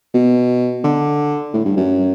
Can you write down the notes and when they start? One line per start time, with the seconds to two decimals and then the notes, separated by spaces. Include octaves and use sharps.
0.14 B2
0.84 D3
1.54 A2
1.65 G2
1.77 F#2